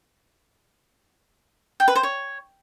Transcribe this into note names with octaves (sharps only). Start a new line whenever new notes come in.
G5
B4
C5
C#5